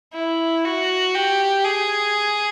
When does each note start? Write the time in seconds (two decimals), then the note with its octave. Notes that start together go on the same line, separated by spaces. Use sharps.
0.14 E4
0.65 F#4
1.15 G4
1.65 G#4